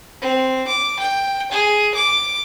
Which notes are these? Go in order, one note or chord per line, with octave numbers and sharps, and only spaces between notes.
C4
D6
G5
G#4
D6